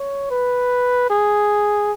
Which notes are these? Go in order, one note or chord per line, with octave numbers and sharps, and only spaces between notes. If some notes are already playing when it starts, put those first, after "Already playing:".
Already playing: C#5
B4
G#4